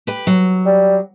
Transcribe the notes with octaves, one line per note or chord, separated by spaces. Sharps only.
G4 B4
F#3
G3